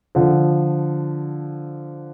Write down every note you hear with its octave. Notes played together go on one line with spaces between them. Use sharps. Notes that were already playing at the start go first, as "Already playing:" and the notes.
D3 F3